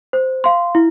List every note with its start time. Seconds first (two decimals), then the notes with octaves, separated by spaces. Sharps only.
0.13 C5
0.44 F5 C6
0.75 E4